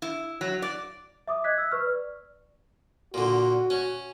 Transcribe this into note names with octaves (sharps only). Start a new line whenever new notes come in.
E4
F#3
D5
E5 D6 D#6
D#5 F#6 G#6 B6
E6
B4 C#6 F6
D5
A#2 D3 F#4
C#4